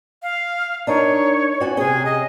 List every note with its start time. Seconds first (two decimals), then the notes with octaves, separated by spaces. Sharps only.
0.23 F5
0.87 D4 D#4 A#4 C#5
1.60 C#4 F#4 D5
1.77 C3 C#4 G#4
2.05 D#5